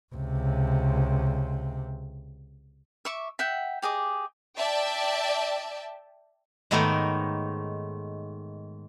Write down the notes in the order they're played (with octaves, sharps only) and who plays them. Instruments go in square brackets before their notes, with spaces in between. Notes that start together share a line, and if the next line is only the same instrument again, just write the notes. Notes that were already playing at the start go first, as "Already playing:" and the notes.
[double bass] C#2 C3
[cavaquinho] E5 C#6 D6
E5 F#5 G5
G4 G#4 D#5 D6
[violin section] D5 E5 G5 A5
[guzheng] G#2 D#3 A3 B3 A#4 C#5